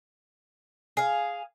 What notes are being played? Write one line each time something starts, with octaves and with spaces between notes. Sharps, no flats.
G#4 F5